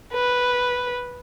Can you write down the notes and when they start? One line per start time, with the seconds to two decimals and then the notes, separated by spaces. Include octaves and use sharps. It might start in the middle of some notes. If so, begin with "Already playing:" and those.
0.13 B4